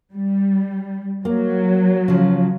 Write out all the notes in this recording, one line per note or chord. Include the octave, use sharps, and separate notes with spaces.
G3
F#3 A#3
C#3 F3